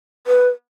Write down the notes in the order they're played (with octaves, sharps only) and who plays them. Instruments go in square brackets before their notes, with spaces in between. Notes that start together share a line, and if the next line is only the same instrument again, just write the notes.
[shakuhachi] B4